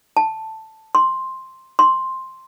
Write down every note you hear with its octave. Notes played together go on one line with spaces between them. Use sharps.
A5
C6
C6